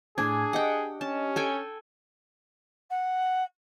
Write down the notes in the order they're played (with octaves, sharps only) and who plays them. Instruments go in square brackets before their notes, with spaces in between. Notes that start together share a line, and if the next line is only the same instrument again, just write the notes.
[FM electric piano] A2 G#5 G#6 [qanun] D4 [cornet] G#4
[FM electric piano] G4 D#5 [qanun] F#5 G5
[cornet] C#4 [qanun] A5
[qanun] A4 G5 G#5
[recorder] F#5